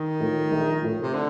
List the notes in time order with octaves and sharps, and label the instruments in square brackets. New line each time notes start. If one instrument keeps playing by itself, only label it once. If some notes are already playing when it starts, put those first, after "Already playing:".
Already playing: [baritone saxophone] D#3
[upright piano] A2 F3
A#1
A2 F3
[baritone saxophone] C3
D3